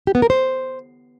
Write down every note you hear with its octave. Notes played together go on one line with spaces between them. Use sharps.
G4
B3
A#4
C5